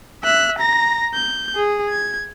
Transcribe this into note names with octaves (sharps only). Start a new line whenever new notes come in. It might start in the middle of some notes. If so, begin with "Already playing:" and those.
E5 F#6
A#5 A#6
G6
G#4
G#6